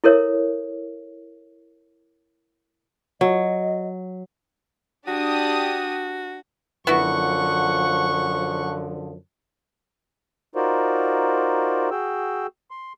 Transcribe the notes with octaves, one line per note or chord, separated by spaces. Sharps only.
E4 A4 A#4 C#5 E5
F#3 D#5
D4 F#4 G4 D#6
F#2 D3 F3 B3 E4 F#4 F#5 C#6
D#4 F4 F#4 A#4 C5 D5
F#4 G#4 G5 E6
C6